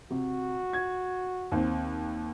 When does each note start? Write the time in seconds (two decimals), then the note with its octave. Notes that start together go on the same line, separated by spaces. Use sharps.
0.10 C3 F#4
0.73 G#6
1.52 D#2 C4